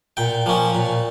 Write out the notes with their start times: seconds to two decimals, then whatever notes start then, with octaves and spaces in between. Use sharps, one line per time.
0.17 A#2 G5
0.46 F3 A#3 C#4
0.75 A#2